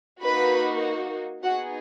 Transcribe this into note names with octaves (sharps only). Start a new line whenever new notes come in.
A#3 D#4 F#4 B4 B5
B3 D#4 F#4 G#4 F#5